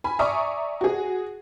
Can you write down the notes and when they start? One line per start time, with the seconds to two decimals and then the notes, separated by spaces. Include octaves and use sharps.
0.04 G#5 B5
0.19 D5 E5 G#5 A#5 C#6 D#6
0.81 F#4 G#4